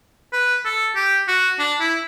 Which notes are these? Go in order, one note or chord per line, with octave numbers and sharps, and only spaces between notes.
B4
A4
G4
F#4
D4
E4